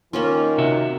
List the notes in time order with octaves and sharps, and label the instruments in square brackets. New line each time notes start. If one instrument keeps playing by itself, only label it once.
[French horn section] D#3 [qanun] A#3 C#4 F4
[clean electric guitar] C3 F#4 E5